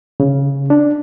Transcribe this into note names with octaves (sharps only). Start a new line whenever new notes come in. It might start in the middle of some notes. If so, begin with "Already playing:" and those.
C#3
D4